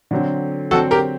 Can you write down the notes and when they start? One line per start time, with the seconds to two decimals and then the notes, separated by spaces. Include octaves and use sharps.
0.11 D3 F#3 C4
0.71 D3 F#3 C4 F#4 A4
0.91 G4 A#4